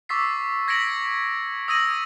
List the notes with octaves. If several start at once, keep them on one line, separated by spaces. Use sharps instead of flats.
C#6 D6 E6 A6 B6 C7
G#6 A#6 B6 C#7 D7 F#7
D#6 E6 G#6 A#6 D#7 F#7